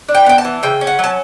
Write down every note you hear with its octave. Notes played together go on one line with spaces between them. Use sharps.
D4
G5
B3 G5
A5
E3
C#3 G5
C#4
F#5
F#3 A5